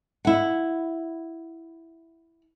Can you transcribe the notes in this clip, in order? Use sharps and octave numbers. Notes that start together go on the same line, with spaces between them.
E4 F#5